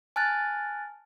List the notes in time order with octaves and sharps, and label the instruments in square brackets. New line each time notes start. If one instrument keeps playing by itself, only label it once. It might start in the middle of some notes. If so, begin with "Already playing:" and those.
[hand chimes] G#5 A5 F6 F#6 A6